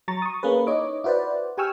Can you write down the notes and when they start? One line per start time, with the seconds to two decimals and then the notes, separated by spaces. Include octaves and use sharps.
0.08 F#3 A#5 C#6 A6
0.22 C#6 D#6
0.43 A#3 C#4 G#4 B4
0.67 D#4 E4 C#5 D#5 D6
1.04 E4 F#4 B4 C5 D5
1.58 G4 G5 G#5 C#6 E6 F6